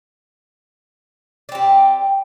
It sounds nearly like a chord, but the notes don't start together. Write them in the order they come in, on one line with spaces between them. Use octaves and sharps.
D5 C4 G4